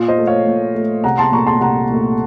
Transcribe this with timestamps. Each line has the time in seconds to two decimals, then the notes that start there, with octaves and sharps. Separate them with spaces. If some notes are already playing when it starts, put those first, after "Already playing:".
Already playing: A#2 F4
0.08 C5 D#5
0.18 A3
0.27 C#5 F5
0.47 A#2
0.75 A3
1.04 C2 F#5 A#5
1.18 A5 C6
1.32 A#2 A3 A#5 C#6
1.46 A5 C6
1.61 C2 F#5 A#5
1.90 A#2 A3